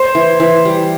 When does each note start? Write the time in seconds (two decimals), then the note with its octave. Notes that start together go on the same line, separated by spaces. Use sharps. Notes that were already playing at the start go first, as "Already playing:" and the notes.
Already playing: C5
0.15 E3
0.40 E3
0.65 G3